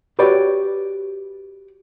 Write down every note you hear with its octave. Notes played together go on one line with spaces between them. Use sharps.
F#4 G4 B4 C#5 D5